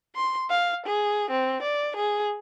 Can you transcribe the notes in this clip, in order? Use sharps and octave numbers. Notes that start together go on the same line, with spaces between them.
C6
F5
G#4
C4
D5
G#4